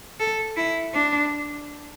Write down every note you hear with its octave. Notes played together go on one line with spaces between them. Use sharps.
A4
E4
D4